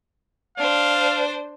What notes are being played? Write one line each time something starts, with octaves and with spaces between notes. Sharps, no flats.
D4 C5 F5